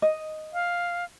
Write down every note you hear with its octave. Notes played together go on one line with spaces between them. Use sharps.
D#5
F5